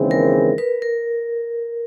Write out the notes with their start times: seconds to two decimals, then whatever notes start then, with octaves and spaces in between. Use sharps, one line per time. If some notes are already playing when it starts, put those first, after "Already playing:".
Already playing: D#2 C#3 E3 G#3 C4
0.11 A#4
0.58 B4
0.82 A#4